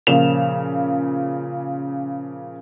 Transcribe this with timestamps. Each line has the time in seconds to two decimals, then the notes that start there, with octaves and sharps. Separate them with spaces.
0.07 A#2 C#3 F3 E7 F7